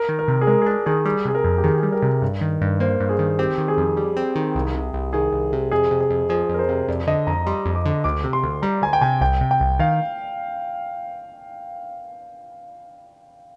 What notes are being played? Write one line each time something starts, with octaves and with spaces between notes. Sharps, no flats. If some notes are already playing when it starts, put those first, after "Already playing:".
Already playing: A#4
D#3
A#4
C3
G#4
G#3 A#4
G#4
D4 A#4
D#3 G#4
G3 G#4
C3 G#4
A#4
F2
G4
D#3 G#4
G#4
G3
A#4
C3
G2
D#3
G2
A#3 C5
G2
G#4
D#3
C4 G4
D#3
G#4
F2
G3
C4
D#3
C2
C3
C2
D#3 G#4
C2
C3
F2 G#4
C3
G#4
F2
F3 G#4
F2 A#4
C5
C3
F2 D5
D3 D#5
F2 A#5
G3 C6
F2
D6
D3
D2 D6
C3
C6
D2
G3 A#5
D2 G#5
G5
C3 G#5
C2 G5
C3
G5
C2
D#3 F5